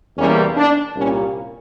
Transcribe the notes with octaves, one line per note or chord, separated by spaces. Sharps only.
E2 C3 E3 G3 A#3 C#4
D4
C2 A#2 G3 A#3 C#4